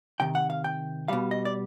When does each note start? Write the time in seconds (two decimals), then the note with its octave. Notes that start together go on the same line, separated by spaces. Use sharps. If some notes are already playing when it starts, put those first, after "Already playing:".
0.20 C3 D#3 G5
0.35 F#5
0.50 F5
0.64 G5
1.08 B2 G3 F5
1.31 D#5
1.45 D5